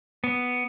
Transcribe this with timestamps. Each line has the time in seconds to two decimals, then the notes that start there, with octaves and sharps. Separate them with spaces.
0.24 B3